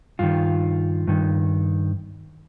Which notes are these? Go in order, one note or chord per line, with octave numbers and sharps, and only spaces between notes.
G2 D#3 F4
G2 D#3